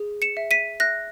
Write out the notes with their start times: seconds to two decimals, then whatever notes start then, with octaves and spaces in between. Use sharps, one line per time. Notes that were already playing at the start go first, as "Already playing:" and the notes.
Already playing: G#4
0.22 C#7 E7
0.37 E5
0.51 B6 D#7
0.80 E5 F#6 A#6